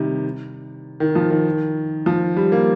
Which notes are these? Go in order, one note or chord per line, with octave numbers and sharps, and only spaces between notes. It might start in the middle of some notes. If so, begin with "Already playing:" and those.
Already playing: C3 D#3 G3
D#3
F3
D#3
F3
G3
A#3